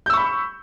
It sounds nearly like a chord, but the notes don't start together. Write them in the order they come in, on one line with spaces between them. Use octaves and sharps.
G6 E6 C#6 B5